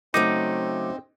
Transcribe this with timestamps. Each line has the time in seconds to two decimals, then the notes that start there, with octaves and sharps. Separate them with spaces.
0.14 C#3 F#3 A3 C4 D#4 D6